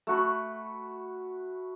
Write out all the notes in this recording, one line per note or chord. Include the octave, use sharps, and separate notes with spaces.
A3 F#4 B5